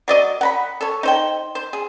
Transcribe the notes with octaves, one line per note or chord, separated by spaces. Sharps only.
F#3 D5 D#5
F#5 A#5 B5
A4 C#5
D#4 C5 G5
C5
G#4